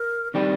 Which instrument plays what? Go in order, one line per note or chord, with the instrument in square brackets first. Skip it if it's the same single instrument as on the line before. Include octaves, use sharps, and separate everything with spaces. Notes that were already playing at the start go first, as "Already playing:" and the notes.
Already playing: [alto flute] A#4
[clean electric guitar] D#3 G3 D4 G4 [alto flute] C4